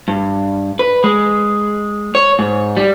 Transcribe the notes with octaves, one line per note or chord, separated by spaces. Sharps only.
G2
B4
G#3
C#5
G#2
G3